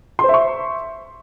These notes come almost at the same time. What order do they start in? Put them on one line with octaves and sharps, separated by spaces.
C6 C5 E5 C#6